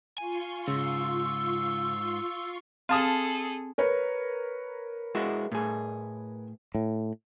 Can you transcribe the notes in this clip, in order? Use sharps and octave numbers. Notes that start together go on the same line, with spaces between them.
F4 G#5 C6 C#6
G#2 C#3 E6
C4 G#4 A4 F5 A5 D#6
A#4 B4 C#5
G#3 E4 F#4
A2 G#4
A2